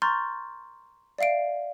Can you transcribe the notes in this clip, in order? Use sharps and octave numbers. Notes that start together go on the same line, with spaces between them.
A#5 C6 C#6 F6 G6 A6
D5 E5 F5 C7 D7